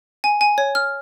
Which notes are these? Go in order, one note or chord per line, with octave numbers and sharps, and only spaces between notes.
G#5
G#5
C#5
F6